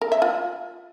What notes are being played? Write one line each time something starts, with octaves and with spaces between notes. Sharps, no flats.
A#4
E5
F4